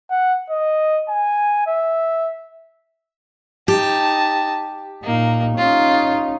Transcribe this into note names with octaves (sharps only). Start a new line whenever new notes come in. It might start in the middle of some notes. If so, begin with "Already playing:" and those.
F#5
D#5
G#5
E5
D#4 G4 A5
A#2 A#3 D#4
C#4 D#4 F4